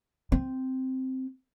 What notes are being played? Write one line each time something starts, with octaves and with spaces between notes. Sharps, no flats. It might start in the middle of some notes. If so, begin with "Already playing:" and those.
C4